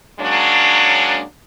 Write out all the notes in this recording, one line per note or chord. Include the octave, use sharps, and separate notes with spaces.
F#3 G#3 A#3 C#4 D4